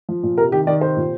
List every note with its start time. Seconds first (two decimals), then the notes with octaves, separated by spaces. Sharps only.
0.09 F3
0.23 A#2
0.38 C3 A#4
0.52 D#3 G4
0.67 D#3 D5
0.81 C3 C5
0.96 A#2